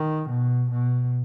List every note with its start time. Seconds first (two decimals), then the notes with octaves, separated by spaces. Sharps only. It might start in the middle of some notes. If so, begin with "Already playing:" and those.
Already playing: D#3
0.29 B2
0.71 B2